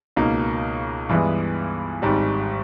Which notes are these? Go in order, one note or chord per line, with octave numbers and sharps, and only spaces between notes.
C#2 B2 A#3 D#4
G2 E3 G#3 B3 E4
G#1 G#2 G3